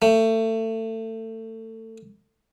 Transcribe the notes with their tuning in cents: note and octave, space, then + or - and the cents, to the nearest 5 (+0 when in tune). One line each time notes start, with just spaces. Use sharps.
A3 +25